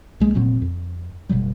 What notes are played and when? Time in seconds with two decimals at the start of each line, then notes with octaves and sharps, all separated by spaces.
0.20 B1 G#3 A#3
0.34 F1 A#2 F#3 C4
0.62 F2
1.29 F#1 B2 F#3 G3